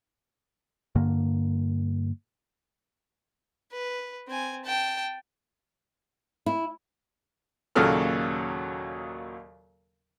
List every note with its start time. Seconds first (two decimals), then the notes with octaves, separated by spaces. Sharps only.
0.95 G2 D3 A#3
3.72 B4
4.28 C4 G#5
4.65 G5 A5
6.46 E4
7.75 D#2 A#2 C#3 F#3 A4 F6